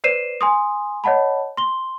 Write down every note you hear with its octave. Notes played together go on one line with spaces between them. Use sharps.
B4 C5 D5 C7 D#7 E7
G#5 C6 D#6
C#5 D#5 F#5 A5 B5
C6 G7